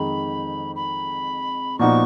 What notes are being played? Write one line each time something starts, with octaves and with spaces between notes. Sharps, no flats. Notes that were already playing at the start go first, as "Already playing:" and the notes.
Already playing: F2 D#3 G#3 D#4 B5
B5
A#2 F3 B3 D#4 F#4 C#6